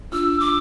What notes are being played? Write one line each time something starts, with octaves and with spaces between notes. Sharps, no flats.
D4 F4 E6
D6